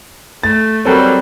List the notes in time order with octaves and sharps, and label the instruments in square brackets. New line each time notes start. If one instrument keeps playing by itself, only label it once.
[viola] A3 [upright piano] A6
[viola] F#3 G3 [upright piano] C4 A4 A#4